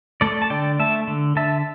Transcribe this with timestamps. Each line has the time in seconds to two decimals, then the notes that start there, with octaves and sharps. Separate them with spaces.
0.21 A3 A4 D5
0.42 A5
0.50 D3 D5 G5
0.79 A3 E5 A5
1.07 D3
1.36 D3 E5 A5